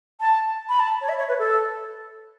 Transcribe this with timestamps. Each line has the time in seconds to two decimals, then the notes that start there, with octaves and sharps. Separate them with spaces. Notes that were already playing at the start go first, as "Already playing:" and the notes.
0.21 A5
0.69 B5
0.80 A5
1.01 C#5
1.09 E5
1.18 C#5
1.29 B4
1.39 A4